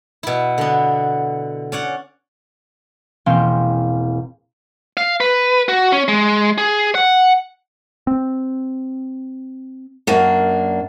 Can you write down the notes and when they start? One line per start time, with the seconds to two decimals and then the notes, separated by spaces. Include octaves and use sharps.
0.23 B2 E4
0.58 D3 B3
1.72 C#4 D5 F#5
3.26 E1 A#3 C4 C#4 F5 G6
4.97 F5
5.20 B4
5.68 F#4
5.92 C#4
6.08 G#3
6.58 G#4
6.95 F#5
8.07 C4
10.07 F#2 A#3 D4